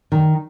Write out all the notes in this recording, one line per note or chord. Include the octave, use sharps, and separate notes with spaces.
D#3